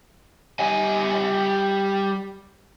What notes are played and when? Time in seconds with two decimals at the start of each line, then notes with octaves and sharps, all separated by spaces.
0.60 G3 G#5